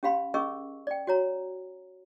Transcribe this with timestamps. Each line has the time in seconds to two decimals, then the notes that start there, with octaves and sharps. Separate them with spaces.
0.03 C#4 G4 F5 B5 C6
0.34 C#4 G#4 A#4 D#5 C#6 E6
0.87 D5 G5
1.07 F#4 C#5 A#5